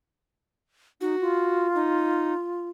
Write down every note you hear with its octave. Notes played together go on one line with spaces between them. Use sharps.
D#4 F#4
F4
D#4